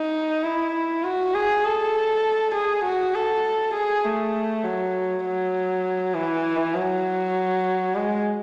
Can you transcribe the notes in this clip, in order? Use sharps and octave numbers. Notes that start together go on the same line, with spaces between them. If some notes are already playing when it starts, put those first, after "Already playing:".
Already playing: D#4
E4
F#4
G#4
A4
G#4
F#4
A4
G#4
A3
F#3
F#3
E3
F#3
G#3